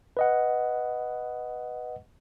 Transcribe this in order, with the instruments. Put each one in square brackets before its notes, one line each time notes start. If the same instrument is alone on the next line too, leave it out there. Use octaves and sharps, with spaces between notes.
[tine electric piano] B4 D#5 F#5